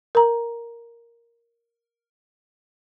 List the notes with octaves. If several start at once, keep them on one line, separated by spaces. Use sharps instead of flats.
A#4 A#5